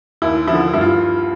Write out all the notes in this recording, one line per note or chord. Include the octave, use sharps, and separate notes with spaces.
D#2 E4
D3 F3 E4
G2 E4
F4